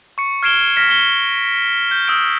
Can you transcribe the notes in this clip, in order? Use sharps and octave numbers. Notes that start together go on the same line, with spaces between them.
C#6 C#7
F6 G#6 C7 D7 E7 G7
F6 A#6 B6 E7 G7
G7
G6
D#6 E6 G6 D7